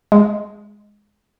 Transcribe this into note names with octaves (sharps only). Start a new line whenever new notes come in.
G#3